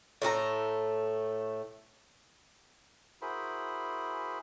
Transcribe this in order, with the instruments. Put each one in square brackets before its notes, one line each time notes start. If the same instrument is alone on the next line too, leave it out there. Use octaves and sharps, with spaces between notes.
[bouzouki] A2 A3 G#4 A#5
[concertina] E4 F#4 G#4 A#4 C5 B5